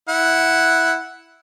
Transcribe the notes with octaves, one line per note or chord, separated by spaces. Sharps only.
E4 F#5